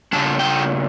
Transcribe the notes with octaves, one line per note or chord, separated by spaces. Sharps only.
C#3 G3 D4 A5
G5